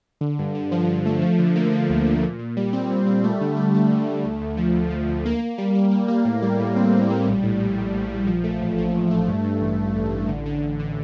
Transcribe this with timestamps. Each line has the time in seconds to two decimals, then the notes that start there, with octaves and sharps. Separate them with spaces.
0.21 D3
0.39 G2
0.55 D3
0.72 F3
0.89 F3
1.05 A3
1.22 F3
1.39 D3
1.56 A#3
1.73 A#3
1.89 D2
2.06 F3
2.23 A#2
2.39 A#2
2.57 G3
2.73 C4
2.90 A#2
3.07 G3
3.24 A3
3.41 D3
3.57 A3
3.74 A3
3.91 D3
4.07 A3
4.25 D2
4.41 D2
4.57 F3
4.74 D2
4.91 F3
5.08 D2
5.26 A#3
5.41 A#3
5.58 G3
5.75 G3
5.91 G3
6.08 A#3
6.25 A2
6.42 G3
6.60 A2
6.76 C4
6.93 A2
7.10 G3
7.27 A#1
7.43 A2
7.60 A2
7.77 A#1
7.93 A#1
8.11 A#1
8.27 F3
8.44 A3
8.61 A1
8.78 F3
8.94 A1
9.11 A3
9.28 G2
9.44 G2
9.61 A1
9.78 A1
9.95 A1
10.12 A1
10.28 D3
10.46 D3
10.62 D3
10.79 D3